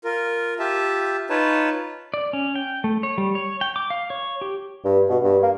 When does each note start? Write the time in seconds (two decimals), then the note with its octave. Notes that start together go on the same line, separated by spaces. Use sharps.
0.04 F4 A#4
0.59 F4 G4 E5 A5
1.30 D#4 F4 B4 C#5 A5
2.14 D5
2.33 C#4
2.55 G5
2.84 A3
3.03 C#5
3.18 G3
3.35 C#5
3.61 G5
3.76 D6
3.90 F5
4.10 C#5
4.41 G4
4.85 G2
5.09 B2
5.23 G2
5.43 A#3